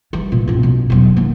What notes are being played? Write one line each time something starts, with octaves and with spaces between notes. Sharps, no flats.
E3 G3
A#2
F#1 F4
B2 C#4
E1 F#3
D#3 A#3